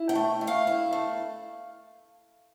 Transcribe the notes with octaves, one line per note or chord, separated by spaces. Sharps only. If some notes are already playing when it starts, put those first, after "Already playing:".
Already playing: E4
G5
A3
A3
F5
E4
A3